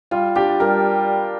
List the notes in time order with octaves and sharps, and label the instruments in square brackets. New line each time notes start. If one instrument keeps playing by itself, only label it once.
[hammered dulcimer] G3 [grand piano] F4
[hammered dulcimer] D4 [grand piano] G4
[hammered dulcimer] G3 [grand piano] A#4